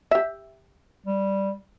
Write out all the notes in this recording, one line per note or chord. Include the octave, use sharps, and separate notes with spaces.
G4 E5
G3